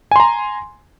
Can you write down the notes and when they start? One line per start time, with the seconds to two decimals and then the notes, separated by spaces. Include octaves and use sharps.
0.11 G#5
0.16 C6
0.20 A#5